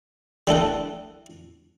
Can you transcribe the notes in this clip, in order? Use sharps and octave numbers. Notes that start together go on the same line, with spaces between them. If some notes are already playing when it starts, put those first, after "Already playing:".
G3 E4 A4 F#5